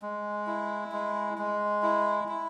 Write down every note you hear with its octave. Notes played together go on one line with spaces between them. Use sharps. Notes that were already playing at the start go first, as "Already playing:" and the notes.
G#3
E4
G#3
G#3
E4
E4